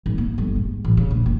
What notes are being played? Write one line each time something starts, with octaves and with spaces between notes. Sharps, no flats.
G#1
A#3
G1
G#2
A1
C#3
A#1
F#1